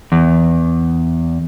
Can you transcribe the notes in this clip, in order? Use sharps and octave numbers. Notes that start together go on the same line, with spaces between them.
E2